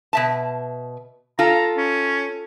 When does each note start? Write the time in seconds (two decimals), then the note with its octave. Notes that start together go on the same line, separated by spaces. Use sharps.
0.13 B2 E5 A5
1.39 F4 A4 A#5
1.77 C#4